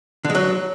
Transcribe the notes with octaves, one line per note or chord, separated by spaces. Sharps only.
D3
G#3
F#3